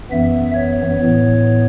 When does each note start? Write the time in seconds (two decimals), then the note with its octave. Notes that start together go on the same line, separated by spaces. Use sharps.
0.11 F#2 E3 B3 E5
0.54 C#5
0.99 A2 E3 B3